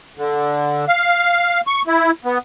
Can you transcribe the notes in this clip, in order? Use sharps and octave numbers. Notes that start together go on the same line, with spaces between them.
D3
F5
C#6
E4
B3